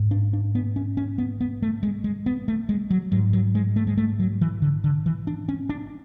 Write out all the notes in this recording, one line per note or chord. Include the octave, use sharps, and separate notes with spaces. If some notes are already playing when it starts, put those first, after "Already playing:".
Already playing: G#2
D4
D4
B3
C#4
C#4
B3
B3
A3
G#3
G#3
B3
A3
G#3
F#3
G#2 F#3
F#3
G#3
A3
G#3
A3
F#3
E3
D3
D3
E3
D4
C#4
D4